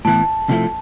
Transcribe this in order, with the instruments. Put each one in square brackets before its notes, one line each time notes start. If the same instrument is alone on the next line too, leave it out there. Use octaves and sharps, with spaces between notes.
[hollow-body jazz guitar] A2 E3 B3 E4 [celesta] A5
[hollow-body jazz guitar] C3 F3 A3 E4 A4